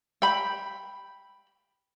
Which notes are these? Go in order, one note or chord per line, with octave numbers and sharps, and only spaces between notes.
G5 B5